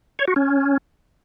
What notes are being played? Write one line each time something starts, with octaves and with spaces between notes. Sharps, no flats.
C#5
F#4
C#4